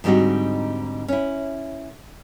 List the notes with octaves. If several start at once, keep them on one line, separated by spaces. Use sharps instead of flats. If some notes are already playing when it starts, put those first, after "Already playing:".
G#2 D3 G3 C4 D#4 F#4
C#4 E4